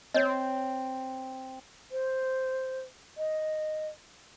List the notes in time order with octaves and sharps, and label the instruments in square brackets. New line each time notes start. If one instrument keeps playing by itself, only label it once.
[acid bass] C4 [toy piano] C#5 D#5
[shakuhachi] C5
D#5